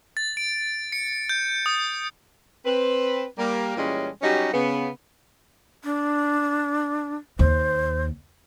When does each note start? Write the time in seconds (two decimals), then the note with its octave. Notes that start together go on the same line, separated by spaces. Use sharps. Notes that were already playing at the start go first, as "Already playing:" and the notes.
0.17 A6
0.37 D7
0.92 C#7
1.29 G6
1.66 D#6
2.65 C4 B4
3.38 G3 A#3
3.77 A#2 E3 G3 G#3 C#4
4.22 F#3 G3 C#4 D#4 F#4 G4
4.53 C#3 B3
5.84 D4
7.39 D#2 C5